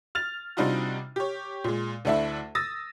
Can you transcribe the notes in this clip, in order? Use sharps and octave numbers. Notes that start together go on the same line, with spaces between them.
F6 A6 F7
C3 G3 D4 D#4 F4 F#4
G4 C#5
A#2 G#3
D2 A3 D4 E4 E5
D#6 E6 A6 A#6